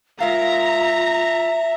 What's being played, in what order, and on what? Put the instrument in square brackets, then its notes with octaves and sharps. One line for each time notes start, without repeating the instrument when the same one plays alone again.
[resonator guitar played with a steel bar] G#3 A#4 F5 [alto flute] F4 [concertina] E5 [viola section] A#5